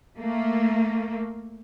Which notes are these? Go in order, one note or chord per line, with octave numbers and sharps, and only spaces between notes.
A3 A#3